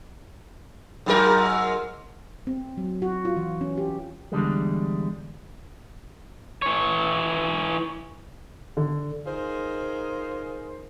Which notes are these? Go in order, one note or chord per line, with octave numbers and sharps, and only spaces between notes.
G#2 F#3 A#4
C4
F#3
F#4
F4
E3
C#4
G4
E2 D3 G3 G#3
E3 C#5
D3
D#4 F4 G#4 A#4 C5